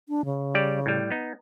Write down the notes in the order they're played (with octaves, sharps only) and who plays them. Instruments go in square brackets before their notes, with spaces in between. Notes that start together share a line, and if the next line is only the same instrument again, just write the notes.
[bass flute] D4
C#3
[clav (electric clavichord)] G3 G4 D5
A2 G3
B3 D#4